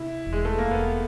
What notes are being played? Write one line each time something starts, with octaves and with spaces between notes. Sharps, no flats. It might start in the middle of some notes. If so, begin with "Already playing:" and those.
Already playing: C3 E4
E1
G#3
A3
A#3
E1 B3